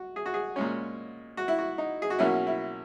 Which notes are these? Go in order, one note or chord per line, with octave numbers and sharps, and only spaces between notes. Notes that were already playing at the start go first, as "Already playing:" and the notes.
Already playing: F#4
G#4
F#4
G#4
A#2 G#3 C#4
F#4
E4
F#4
D#4
G#4
F#4
B1 B2 A#3 C#4 E4
E4